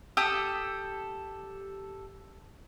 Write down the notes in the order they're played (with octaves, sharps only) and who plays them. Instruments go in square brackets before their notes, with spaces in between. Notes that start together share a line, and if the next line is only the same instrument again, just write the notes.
[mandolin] G4 A4 D#6 E6